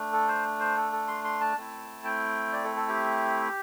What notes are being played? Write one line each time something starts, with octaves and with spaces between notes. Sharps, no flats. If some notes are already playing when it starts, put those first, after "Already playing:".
Already playing: A3 D4
A4
C5
C5
A4
A4
C6
C6
A5
A3 C4 E4
G5
D5
A4
A4
G4